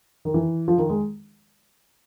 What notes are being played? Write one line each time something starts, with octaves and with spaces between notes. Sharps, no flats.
D#3
E3
F3
D#3
G#3